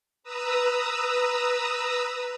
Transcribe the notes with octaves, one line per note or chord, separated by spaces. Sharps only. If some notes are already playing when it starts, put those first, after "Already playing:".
B4 A#5 D#6 E6